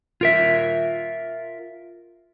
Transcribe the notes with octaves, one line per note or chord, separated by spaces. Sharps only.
F4 A#4 E5